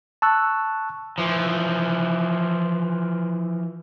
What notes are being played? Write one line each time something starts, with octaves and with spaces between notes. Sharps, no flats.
A5 C#6 E6 F#6
E3 F3